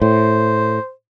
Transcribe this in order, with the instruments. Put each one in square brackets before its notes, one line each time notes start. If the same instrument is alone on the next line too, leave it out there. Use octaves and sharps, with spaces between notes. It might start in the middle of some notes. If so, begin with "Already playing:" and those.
[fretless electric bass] A2 [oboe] C5